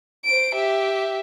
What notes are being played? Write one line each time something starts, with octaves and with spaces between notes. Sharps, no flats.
C5 D7
G4 E5